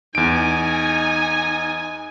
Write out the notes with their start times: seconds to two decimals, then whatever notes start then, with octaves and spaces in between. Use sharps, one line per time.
0.15 E2 D#4 G#5 D7